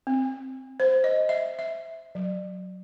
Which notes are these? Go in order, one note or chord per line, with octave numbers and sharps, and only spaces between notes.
C4
C5
D#5
E5
E5
F#3